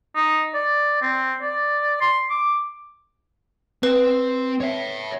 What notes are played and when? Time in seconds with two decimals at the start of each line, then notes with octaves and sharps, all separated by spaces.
0.15 D#4
0.54 D5
1.02 C4
1.42 D5
2.01 C6
2.30 D6
3.83 C4 B4
4.61 C#5 E5